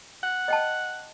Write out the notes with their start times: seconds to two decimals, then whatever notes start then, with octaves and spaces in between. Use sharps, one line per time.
0.23 F#5
0.48 D#5 G5 A5